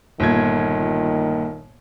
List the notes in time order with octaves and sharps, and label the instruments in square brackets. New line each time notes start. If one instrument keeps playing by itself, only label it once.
[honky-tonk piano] G1 A#2 G#6 [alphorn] D#3